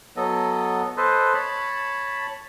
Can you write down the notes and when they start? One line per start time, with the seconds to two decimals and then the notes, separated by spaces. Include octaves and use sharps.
0.16 F#3 B3 A4 D#5
0.97 A4 B4 C5 D#5
1.34 C#5 A5 B5